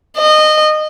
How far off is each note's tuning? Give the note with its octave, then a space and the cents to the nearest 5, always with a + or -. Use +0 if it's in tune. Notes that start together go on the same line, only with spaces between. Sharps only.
D#5 -20